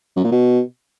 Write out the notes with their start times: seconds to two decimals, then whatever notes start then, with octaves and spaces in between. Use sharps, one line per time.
0.16 F#2
0.24 A#2
0.31 B2